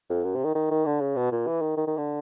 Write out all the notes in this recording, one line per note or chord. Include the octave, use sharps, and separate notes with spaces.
F2
F#2
C3
D#3
D#3
D#3
D3
C#3
B2
A#2
E3
D#3
D#3
D#3
D3